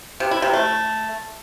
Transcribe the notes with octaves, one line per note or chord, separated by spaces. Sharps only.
C3
E4
C3
A3